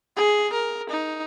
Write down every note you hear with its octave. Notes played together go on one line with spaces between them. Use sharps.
G#4
A#4
D#4